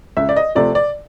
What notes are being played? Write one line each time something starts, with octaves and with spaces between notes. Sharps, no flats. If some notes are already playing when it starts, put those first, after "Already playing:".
C#2 E5
D5
D#5
C3 F3 A3 D5
D5